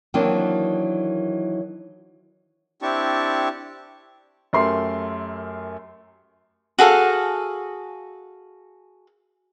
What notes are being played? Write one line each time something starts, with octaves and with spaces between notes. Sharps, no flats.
D#3 E3 F#3 A#3 C4 D4
C4 D4 E4 G4 A5 C#6
F#2 A3 G4 A#4 C6 C7
F#4 G#4 A4 F5